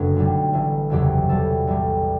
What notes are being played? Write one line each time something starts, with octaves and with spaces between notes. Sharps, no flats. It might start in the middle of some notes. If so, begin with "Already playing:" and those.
Already playing: F#1 F#2 D3 F#3 A3 B4
B1 B2 G3
A1 A2 E3
F#1 E2 C3 F#3 G4
E2 B2 G3 A4
A1 A2 G3